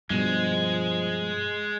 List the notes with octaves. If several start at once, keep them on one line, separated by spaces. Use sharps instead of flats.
G2 B2 F3 G#3 D4